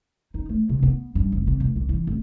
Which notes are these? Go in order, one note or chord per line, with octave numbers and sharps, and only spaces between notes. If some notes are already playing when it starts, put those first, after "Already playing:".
D#4
A3
C3
B3
G2
F1
C3
D1
C2
E3
D1